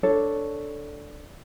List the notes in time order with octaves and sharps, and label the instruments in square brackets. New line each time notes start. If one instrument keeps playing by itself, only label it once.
[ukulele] D4 A4 C#5